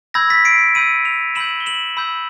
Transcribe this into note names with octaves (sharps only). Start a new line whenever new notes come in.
B5 E6 G6 G#6 A#6
A6 B6
C7 D7
B5 E6 G6 C#7 D#7
D#7 F7
B5 E6 G6 E7 F#7
G7
E7 F#7
B5 E6 G6